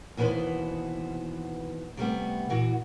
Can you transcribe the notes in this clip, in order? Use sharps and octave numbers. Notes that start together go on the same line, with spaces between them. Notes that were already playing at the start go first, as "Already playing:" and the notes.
D#2 B2 E3 B3 B4 C5
C3 G3 A3 B3
A#2 E3 F#4